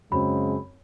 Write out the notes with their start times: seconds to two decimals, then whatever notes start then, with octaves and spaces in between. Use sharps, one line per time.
0.12 F#2 C#3 F#3 G#3 C4 B5